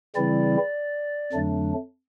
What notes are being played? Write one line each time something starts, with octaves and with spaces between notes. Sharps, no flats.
C#3 E3 G3 C4 E4 D5
F2 D3 F#3 A3 D4